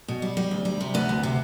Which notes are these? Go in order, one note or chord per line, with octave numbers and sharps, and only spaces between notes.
B2
G3
G3
D2
G3
C3
D2 B3
D2
C3